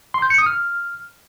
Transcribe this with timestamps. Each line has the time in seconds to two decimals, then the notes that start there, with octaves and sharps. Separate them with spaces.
0.14 C6
0.22 G6
0.30 C#7
0.38 D#6
0.46 F6